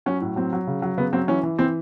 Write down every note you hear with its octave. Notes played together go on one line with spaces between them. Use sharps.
F#3 C#4
A2
F#3 C4
F#3
C#3
F#3
C#3 B3
F#3 C4
E3 C#4
E3
E3 C4